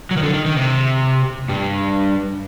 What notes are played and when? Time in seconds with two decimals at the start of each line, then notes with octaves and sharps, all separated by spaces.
0.11 F#3
0.17 D#3
0.23 D3
0.34 D#3
0.46 D#3
0.57 C3
1.49 G2